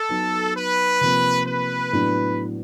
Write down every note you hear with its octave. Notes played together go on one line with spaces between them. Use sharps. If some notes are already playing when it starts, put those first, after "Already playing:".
Already playing: A4
F#3 B3 D#4
B4
C3 F3 A#3
B4
A2 F#3 B3 D4